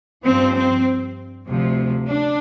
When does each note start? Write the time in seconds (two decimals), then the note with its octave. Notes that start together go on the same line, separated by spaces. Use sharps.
0.24 G2 F3 C4
0.55 C4
1.47 D2 C3 F3
2.08 D4